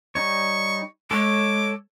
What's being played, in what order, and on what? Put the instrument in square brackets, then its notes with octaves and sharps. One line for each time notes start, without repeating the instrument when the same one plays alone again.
[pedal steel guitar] G3 D#4 C#5 [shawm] C#6
[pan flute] G#3 [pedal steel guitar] A4 C#5 [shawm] D6